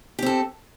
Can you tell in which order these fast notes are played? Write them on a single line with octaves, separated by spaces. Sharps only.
G4 C4 A4